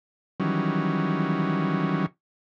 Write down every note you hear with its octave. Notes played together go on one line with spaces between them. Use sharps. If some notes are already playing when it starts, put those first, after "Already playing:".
D#3 E3 F#3 G3 C#4